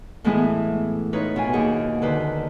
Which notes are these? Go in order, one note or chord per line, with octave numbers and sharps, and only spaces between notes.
A2 E3 G#3 B3 E4 G#4
D#4 F4 B4 C#5
B2 F4 G#5
D#2 G#4 F#5
D3 D#3 B4 C5